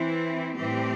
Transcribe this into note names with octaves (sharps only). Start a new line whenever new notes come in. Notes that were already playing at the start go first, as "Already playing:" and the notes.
Already playing: E3 C4 E4
A2 E3 G3 C4 G4